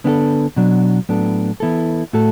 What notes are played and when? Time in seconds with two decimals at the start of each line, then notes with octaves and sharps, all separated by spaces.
0.04 D3 B3 D4 F#4 A4
0.56 B2 F#3 D4
1.09 A2 F#3 B3 D4 A4
1.60 E3 B3 E4 A4
2.13 A2 A3 F#4 A4